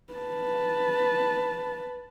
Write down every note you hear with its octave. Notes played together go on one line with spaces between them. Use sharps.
B4 A5